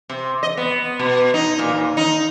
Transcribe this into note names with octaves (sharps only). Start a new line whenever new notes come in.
C3
D#5
B3
B2
D#4
A#2
D#2
D#4